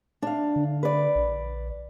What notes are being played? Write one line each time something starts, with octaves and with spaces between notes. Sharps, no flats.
D4 F5
D3
B4 D5
A#1